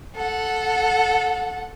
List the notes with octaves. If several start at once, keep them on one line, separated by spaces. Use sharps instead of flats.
A4 F#5